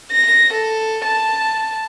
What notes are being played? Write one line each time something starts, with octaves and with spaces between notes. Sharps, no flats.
A#6
A4
A5